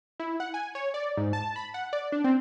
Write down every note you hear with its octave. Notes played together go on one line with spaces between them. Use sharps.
E4
F#5
G#5
C#5
D5
G#2
A5
B5
F#5
D5
D4
C4